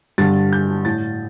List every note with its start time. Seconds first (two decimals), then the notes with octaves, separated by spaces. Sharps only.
0.18 G2 D3 A6
0.53 G6
0.85 A2 A6